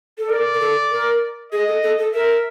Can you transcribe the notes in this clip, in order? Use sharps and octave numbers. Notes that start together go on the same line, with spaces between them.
A4
A#4 D5
A#4
A4
A#4
G#4 D#5
A4
A4
A4
A#4 E5